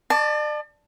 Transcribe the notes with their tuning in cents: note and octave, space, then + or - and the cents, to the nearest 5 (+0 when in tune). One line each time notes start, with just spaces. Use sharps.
D5 +40 A5 +0 D6 -25